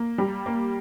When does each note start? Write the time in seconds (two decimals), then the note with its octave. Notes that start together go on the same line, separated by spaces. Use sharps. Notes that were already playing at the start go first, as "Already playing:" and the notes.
Already playing: A#3
0.18 G3
0.46 A#3